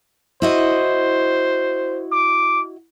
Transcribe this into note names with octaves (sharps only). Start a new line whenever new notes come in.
E4 F#4 C5 D#5
D6